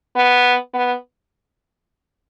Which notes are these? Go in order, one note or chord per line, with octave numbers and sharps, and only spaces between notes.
B3
B3